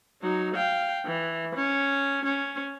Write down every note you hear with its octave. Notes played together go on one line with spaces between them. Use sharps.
F#3 D#4
F5 G5
E3
C#4
C#4